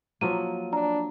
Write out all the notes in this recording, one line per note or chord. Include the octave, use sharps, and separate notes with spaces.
F3 F#3 A#3 D#7
D4 A#5